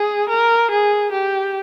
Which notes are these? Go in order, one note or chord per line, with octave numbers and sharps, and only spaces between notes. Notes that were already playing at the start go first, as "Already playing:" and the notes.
Already playing: G#4
A#4
G#4
G4